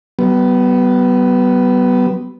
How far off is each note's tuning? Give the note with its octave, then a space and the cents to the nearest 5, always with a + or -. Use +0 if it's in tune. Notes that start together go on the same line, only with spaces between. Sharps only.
G3 -45 B3 +0